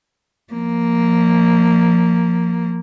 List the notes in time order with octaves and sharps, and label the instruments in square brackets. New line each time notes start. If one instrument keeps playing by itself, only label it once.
[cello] F3 A#3